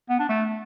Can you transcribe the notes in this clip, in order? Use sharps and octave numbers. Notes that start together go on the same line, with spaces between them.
B3
D4
A3